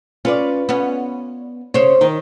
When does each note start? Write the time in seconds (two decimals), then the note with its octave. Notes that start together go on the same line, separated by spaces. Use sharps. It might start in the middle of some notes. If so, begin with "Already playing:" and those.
0.25 C#4 F4 B4 D5
0.69 B3 C#4
1.74 C#3 C5 C#5
2.01 D#3 D#4